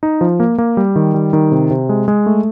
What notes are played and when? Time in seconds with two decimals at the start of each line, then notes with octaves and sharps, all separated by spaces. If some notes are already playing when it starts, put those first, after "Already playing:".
0.03 D#4
0.21 F3
0.40 A#3
0.58 A#3
0.77 G3
0.96 D#3
1.14 G3
1.33 D#3
1.52 C3
1.71 C3
1.89 G#3
2.08 G#3
2.26 A3